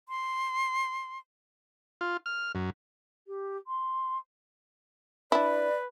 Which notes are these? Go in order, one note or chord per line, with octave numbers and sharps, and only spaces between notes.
C6
F4
F6
F#2
G4
C6
D4 E4 B4 D5